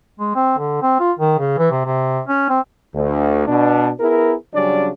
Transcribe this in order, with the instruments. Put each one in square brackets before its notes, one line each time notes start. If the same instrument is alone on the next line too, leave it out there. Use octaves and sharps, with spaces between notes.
[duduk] G#3
C4
D3
C4
F4
D#3
C#3
E3
C3
C3
C#4
C4
[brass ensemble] D2
B2 D4
B3 E4 G#4 A#4
C#3 F#3 G3 C#4 D4 D5